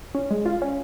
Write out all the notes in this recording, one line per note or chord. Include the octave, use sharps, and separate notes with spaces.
C#4
G#3
F4
C#4